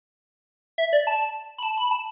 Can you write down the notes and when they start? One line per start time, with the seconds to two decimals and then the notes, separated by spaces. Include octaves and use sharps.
0.78 E5
0.93 D5
1.07 A5
1.58 B5
1.63 A5
1.77 B5
1.91 A5